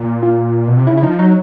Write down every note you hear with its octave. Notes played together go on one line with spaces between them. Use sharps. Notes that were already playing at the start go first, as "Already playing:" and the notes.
Already playing: A#2
F4
B2
C3
C#3 E4
E4
F3 D#4
F#3 D#4